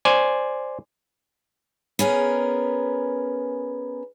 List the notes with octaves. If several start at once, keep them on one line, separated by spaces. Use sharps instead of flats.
C5 D5 G#5
B3 C#4 G#4 A#4